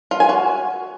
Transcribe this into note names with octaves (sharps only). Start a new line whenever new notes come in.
F4
G#5
F#4